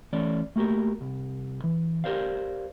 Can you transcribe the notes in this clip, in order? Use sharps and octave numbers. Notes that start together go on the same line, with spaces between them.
E3 A3 C#4 D5
A3 A#3 F#4 G4 A#4
C2
E3
G4 A#4 C5 D5 F5